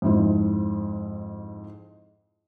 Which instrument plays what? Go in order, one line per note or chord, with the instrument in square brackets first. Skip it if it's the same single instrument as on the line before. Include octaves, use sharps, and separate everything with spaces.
[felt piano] F2 G#2 E4